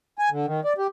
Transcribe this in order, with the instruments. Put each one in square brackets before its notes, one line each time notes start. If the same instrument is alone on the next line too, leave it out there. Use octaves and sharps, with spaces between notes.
[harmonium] G#5
D3
D#3
D5
G4